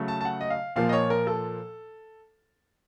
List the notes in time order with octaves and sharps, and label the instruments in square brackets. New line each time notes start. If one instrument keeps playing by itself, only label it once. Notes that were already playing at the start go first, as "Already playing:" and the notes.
Already playing: [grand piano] C#3 F#3 A3
A5
A5
F#5
D#5
F5
A#2 F3 A#3 F5
D#5
C#5
A#4
A4